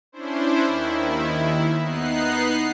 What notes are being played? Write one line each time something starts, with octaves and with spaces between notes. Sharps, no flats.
C#4 D4 E4 C5
D#2 D#3 E4
B3 D#4 F#6 C7